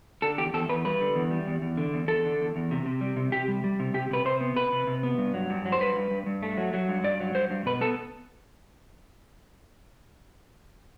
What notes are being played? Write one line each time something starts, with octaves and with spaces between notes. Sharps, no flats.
D3 A4
E2 G4
E2 A4
E2 B4
G3 B4
D3
E2
G3
E2
E2
D3
E2
E2 A4
D3
E2
E2
C3
C3
G3
C3
C3 G4
G3
G3
C3
C3 G4
C3 B4
C3 C5
B3
C3 B4
C3
C3
B3
G2
F#3
G2
F#3
C5
G2 B4
G2
G2
G2
A3
F#3
F#3
G2
G2 D5
F#3
G2 C5
G2
B2 B4
B3 A4